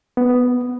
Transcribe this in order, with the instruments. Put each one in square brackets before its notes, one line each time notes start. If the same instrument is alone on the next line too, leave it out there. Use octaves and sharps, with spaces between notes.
[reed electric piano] B3